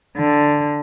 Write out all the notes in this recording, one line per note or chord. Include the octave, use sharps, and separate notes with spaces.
D3